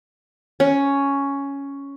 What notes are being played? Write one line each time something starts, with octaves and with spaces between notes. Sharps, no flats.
C#4